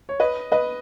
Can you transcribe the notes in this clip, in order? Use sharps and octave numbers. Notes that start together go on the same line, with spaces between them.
C#5
B4 D#5
B4 D#5